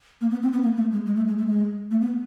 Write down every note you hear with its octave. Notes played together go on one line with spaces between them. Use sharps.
A#3
B3
C4
B3
A#3
A3
G#3
G#3
A3
G#3
A3
G#3
A3
B3